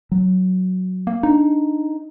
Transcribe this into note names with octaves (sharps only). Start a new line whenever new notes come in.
F#3
A#3
D4 D#4